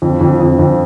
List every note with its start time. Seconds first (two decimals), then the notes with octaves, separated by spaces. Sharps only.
0.02 F2
0.21 F2
0.40 F2
0.59 F2